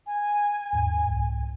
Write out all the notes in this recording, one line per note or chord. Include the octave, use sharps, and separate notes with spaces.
G#5
D#2 G#2
C2